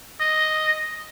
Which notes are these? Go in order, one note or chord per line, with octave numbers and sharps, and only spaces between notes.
D#5